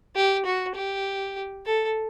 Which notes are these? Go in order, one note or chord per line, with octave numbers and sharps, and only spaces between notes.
G4
F#4
G4
A4